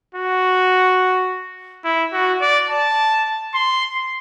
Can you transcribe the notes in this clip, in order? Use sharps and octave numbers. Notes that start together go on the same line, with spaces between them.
F#4
E4
F#4
D5
A5
C6